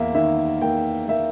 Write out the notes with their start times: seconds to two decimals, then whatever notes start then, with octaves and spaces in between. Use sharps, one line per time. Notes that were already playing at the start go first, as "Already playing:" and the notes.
Already playing: E2 A#3 E5
0.15 D#3 E5
0.62 A#3 G5
1.08 A#3 E5